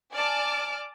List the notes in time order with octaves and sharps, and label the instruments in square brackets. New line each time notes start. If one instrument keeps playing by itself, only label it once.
[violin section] D5 G#5 A5 D6 F6